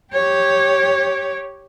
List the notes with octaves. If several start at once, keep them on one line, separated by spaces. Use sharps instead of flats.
G4 C#5